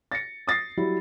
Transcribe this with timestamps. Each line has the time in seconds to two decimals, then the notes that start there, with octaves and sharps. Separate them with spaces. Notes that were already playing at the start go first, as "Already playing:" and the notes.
0.12 A6 A#6 C#7
0.47 D#6 A6 A#6 C7
0.77 F#3 G3 E4